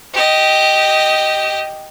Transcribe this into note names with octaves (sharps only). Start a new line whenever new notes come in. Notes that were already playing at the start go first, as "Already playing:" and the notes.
G4 D#5